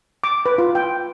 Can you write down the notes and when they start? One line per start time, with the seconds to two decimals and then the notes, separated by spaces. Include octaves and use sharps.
0.24 D6
0.46 B4
0.58 F4
0.75 G5